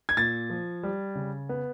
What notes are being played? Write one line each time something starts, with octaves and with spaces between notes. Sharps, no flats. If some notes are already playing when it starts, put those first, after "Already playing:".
G#6
A#2 A6
F3
G3
C#3
B3